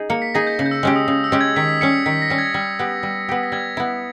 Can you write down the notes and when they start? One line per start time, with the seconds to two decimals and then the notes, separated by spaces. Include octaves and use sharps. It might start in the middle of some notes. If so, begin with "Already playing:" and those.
Already playing: D#4 G#4
0.10 A#3 C#7
0.22 B6
0.34 D#4 G#4 A#6
0.47 G6
0.59 C#3
0.66 G6
0.71 E6
0.83 G#3 C#4 G4 E6
0.96 D#6
1.08 C#3 D#6
1.24 E6
1.32 G#3 C#4 G4
1.41 G#6
1.56 D#3 B6
1.69 B6
1.81 G3 C#4 C#7
2.06 D#3 B6
2.22 A#6
2.30 G3 C#4
2.38 G#6
2.54 G3
2.79 B3 G4
3.03 G3
3.29 B3 G4
3.43 A#6
3.52 G3 G#6
3.77 B3 E4